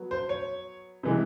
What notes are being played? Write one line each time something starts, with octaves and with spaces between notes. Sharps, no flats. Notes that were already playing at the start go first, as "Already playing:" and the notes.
Already playing: F#3 B3
C5
C#5
C3 E3 G#3